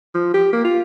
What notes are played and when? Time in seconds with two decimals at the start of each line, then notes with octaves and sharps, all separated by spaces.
0.15 F3
0.34 G4
0.53 A#3
0.65 F4